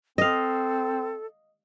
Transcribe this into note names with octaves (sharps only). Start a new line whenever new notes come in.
C4 A4 D#5 F5